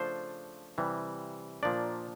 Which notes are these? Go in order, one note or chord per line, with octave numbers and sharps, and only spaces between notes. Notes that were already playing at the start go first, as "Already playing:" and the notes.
Already playing: C#3 F3 A3 D4 C5
C3 E3 G3
A#2 F3 A#3 D4 D5